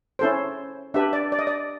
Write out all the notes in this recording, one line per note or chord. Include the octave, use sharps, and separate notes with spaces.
C#4 E4 A4 C5
D4 G4 B4 E5
D5
D5
D#5
D5